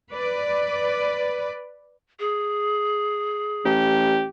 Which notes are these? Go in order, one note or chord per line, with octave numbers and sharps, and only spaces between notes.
B4 D5
G#4
A1 G4